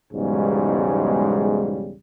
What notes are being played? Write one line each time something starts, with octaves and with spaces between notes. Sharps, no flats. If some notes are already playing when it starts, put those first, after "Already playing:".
B1 E2 G#2 C#3 G3 G#3